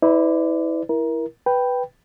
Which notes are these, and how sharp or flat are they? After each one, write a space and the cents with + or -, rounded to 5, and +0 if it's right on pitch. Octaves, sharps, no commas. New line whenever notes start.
E4 -25 B4 +35 D5 +0
E4 +0 A#4 +25
B4 +0 G5 +0